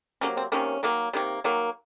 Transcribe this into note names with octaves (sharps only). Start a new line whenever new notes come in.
C3 F#3 A#3 C#4
C4
C3 D#3 A#3 C#4
D#3 F#3 A#3
C3 D#3 A#3
D#3 F#3 A#3